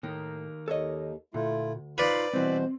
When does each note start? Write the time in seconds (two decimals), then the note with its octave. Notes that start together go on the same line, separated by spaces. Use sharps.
0.03 A2 D#3 A#3
0.68 D#2 A4 C#5 D#5
1.34 D2 A#2 A3 E4 F4
1.98 D#4 F4 B4 C5 D5 F5
2.33 C2 B2 E3 C4 C5